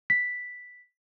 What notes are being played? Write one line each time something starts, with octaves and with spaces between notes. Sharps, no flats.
B6